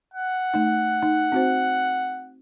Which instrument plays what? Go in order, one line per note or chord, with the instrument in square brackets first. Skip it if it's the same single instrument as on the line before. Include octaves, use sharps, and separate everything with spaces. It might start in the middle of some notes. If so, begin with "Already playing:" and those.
[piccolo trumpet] F#5
[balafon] A3 D#4
D#4
C4 F#4 C5